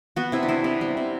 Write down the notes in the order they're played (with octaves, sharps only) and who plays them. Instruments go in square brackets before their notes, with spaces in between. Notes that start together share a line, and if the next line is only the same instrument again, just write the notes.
[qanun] B3 F#4
C3 E4
D4
B3 E4
C3
G3
C3